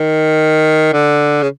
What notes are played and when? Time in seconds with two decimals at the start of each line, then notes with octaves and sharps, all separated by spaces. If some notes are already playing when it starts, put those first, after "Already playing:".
Already playing: D#3
0.93 D3
1.42 C#3